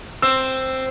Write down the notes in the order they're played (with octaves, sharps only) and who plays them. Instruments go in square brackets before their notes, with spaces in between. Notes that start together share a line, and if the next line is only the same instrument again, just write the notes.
[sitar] C4 [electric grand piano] E6